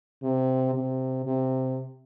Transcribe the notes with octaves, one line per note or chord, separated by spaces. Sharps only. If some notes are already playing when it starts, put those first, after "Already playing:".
C3
C3
C3